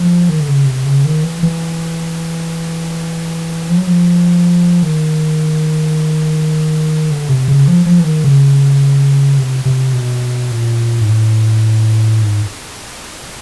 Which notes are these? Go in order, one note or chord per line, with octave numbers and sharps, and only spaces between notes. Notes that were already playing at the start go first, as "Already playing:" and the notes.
Already playing: F3
D#3
D3
C#3
C3
C#3
D#3
E3
E3
F3
F#3
F3
D#3
D3
C3
C#3
F3
F3
E3
D#3
C#3
C3
C3
B2
A#2
G#2
A2
G#2